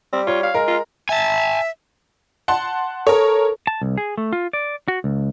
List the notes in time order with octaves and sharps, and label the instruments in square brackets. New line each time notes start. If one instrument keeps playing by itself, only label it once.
[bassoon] G3 [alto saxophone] C4
[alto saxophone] F4 [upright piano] C#5
[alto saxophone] F5
[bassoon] G#3 [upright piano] A#4
[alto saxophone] F4
[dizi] E5 [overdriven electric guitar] G#5 A5
[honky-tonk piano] F#5 A5 C6
[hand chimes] A4 [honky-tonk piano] A#4 C#5
[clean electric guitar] A5
C2
G#4
A3
F4
D5
F#4
C#2